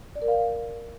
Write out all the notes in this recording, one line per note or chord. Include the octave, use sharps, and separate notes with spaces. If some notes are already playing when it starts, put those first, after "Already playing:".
D5
A#4
F5